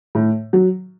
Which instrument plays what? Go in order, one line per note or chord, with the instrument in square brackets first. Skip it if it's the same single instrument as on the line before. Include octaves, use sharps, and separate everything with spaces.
[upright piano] A2
F#3